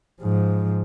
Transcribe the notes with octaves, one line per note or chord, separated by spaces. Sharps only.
G#2 F3